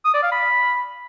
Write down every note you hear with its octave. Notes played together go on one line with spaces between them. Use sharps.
D#6
D5
F5
B5